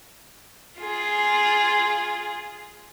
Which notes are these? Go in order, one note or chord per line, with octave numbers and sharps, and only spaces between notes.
F4 G#4